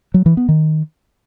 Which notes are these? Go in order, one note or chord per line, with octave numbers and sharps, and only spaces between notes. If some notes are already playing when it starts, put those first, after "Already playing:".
F#3
E3
B3
D#3